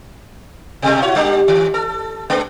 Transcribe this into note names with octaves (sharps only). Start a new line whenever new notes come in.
B2 G3 A3
E4 F#4 C#5
G3 D4 G4
D#3
A4
G#3 B3 D4